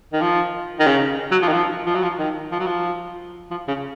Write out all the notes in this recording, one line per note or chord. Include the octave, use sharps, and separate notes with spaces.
D#3
F3
D#3
C#3
F#3
F3
D#3
F3
F3
F#3
F3
D#3
F3
F#3
F3
F3
C#3